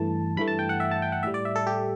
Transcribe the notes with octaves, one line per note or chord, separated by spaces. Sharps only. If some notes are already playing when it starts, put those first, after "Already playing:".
Already playing: G2 E3 A3 A5
G2 E3 A3 B5
A5
G5
F#5
E5
A5
G5
F#5
A2 G3 E5
D5
E5
A4
G4